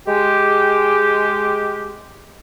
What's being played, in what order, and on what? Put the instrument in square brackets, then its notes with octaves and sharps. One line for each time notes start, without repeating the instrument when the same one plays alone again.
[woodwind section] G#3 G4